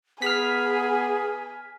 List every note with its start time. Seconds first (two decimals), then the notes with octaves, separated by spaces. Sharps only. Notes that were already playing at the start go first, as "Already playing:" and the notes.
0.22 B3 G#4 G#5 F6 B6